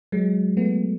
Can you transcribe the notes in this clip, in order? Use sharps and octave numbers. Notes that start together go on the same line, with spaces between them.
F#3 G#3
A3 B3